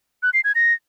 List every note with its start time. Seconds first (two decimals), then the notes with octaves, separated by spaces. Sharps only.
0.23 F#6
0.34 C7
0.44 G#6
0.55 A#6